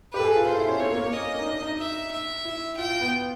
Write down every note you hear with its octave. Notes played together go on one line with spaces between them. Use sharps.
G4 B4
A4
G#4
F4
F4 C5
E4
C#4
C4 C#5
A#3
A#3
C#4 D#5
D#4
D4
D#4
E5
E5
E4
F4 G5
F4
B3